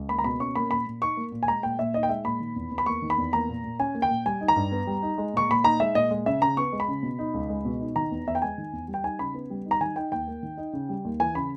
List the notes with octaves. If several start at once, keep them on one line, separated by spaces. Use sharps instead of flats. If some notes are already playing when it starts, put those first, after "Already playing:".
Already playing: C#2
A#3 B5
A#5
B2 B5
C#4 C#6
A#3 B5
A#2 B5
A#2
D#4 C#6
A#3
A#2
G#5
G#3 A#5
A#2 G5
A#2 E5
D#4 D#5
G5
G#3 E5
A#2 B5
D#3
E2
E2
B5
A#3 C#6
D#3
B5
E2
A#3 A#5
A#2
A#2
C#4 G#5
A#3
G5
A#2
G3 G#5
D#4
A#5
G2
B3
G3
D#4
G#3
A#2 C#6
A#2 B5
D#4 A#5
G#3 E5
A#2 D#5
G#3
C#3 E5
C#3 A#5
B3 C#6
G#3
B5
C#3
B2
D#4
C#2
G#3
B2
D#4
D#3 A#5
E2
E2 E5
G5
G#3 G#5
D#3
E2
G3
G5
D#4 G#5
C#3 B5
B3
G3
D#4
A#5
D#3 G#5
D#4 G5
D#2 G5
A#3
D#3
D#4
C#3
G3
D#2
E3 G#5
C#3 B5